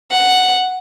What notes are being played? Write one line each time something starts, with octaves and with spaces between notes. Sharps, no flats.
F#5